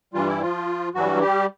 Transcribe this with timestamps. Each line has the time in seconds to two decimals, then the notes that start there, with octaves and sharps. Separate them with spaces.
0.14 G2 E3 G3 F4
0.27 E4
0.41 F3 F4
0.94 G2 E3 F#3 G3 F#4
1.21 G3 G4